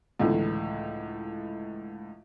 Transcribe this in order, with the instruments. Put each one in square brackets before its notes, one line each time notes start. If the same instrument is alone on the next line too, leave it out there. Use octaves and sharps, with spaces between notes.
[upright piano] C#2 A2 D3 E3